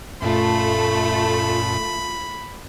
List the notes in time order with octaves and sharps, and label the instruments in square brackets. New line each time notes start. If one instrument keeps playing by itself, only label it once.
[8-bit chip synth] F#2 A#2 [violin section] A3 [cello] F4 [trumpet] B5